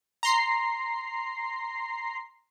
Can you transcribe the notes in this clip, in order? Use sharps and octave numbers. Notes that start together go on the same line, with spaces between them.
A#5 C6 C7